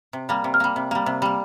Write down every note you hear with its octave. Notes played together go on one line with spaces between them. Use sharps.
C3
G3 A#3
C3
F6
G3 A#3
C3
G3 A#3
C3
G3 A#3